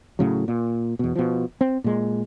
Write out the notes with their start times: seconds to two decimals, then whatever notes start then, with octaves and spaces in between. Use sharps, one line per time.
0.19 A2 C#3 F#3
0.48 A#2
0.99 E2 B2
1.15 B2 F3
1.61 C4
1.84 A#2 G#3